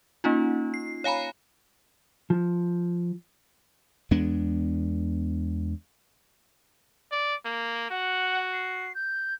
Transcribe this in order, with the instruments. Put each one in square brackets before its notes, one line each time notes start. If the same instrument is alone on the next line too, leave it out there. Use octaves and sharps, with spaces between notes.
[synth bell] A#3 C#4 D#4 F4
C7
C#5 F5 G#5 A#5 B5
[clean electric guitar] F3
[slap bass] E2 G#3 B3 D4
[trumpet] D5
A#3
[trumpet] F#4 [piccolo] F#5
[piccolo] C7
G6